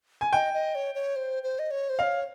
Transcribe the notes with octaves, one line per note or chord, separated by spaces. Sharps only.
G#5
D#5 G5
D#5
C#5
C#5
C5
C5
D#5
C#5
C5
C#5 D#5 F5